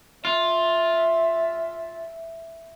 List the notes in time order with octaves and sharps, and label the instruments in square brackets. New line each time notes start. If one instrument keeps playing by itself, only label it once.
[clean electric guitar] F4 [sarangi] E5